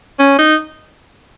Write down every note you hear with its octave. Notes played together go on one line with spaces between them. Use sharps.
C#4
D#4